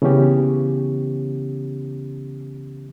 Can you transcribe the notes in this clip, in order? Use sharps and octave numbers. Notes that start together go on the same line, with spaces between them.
C#3 E3 B3 C#4 G4